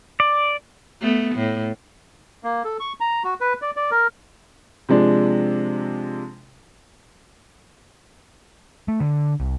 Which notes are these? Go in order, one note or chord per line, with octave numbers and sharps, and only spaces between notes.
D5
A3 B3
A2
A#3
A4
C#6
A#5
F#4
B4
D5
D5
A#4
C3 F3 G#3 D4
A3
D3
C2